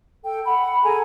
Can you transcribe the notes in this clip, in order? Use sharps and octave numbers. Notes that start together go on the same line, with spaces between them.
A4 G5
F#5 B5
G#4 A4 G#5 A#5